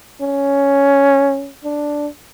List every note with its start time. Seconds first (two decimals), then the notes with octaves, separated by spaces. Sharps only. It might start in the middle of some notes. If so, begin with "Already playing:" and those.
0.22 C#4
1.64 D4